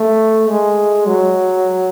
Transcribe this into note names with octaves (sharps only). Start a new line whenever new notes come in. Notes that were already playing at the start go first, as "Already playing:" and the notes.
Already playing: A3
G#3
F#3